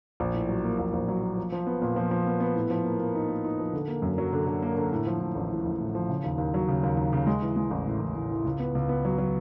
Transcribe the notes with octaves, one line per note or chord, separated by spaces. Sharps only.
A#1
A2
F#3
A#3
A#1
A#1
F#3
A#3
F3
F3
B3
A#2
F3
F3
B3
B3
A2
F3
A#3
A#3
D#4
A#3
D#4
F3
D3
A#3
F#2
F#3
D3
D3
A#3
D3
A2
F3
A2
A1
A2
A1
A2
F3
C#3
D#2
D#2
F#3
C#3
D#2
D#2
C#3
G#3
E3
G#3
A1
A2
A1
A2
E3
C#2
B3
C#2
B3
F#3
F#3